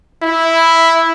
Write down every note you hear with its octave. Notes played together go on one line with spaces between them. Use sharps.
E4